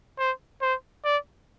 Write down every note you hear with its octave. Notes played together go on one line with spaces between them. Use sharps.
C5
C5
D5